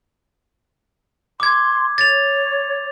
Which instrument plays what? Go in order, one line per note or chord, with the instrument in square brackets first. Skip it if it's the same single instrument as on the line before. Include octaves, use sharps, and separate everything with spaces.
[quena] C6 [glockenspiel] D6 G#6
[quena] C#5 [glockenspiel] A6 F7